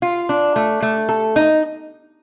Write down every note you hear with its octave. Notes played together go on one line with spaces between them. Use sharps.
F4
D4
A3
A3
A4
D#4